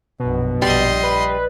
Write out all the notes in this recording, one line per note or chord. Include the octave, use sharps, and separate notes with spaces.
A#1 F#2 B2
A#1 G3 D#5 C6
B4